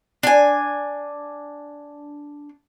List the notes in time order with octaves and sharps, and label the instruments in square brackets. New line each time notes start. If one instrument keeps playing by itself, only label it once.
[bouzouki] D4 G#5